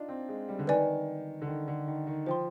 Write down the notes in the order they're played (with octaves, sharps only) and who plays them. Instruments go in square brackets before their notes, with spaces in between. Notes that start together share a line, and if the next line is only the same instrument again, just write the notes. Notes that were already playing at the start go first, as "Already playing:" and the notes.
Already playing: [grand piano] D4 D#4 F4
C4
G#3
G3
D3
[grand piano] D#3 [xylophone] B4 D5 G#5
[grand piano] D3
D#3
D3
D#3
D#3
[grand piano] F3 [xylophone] C5 G5 C6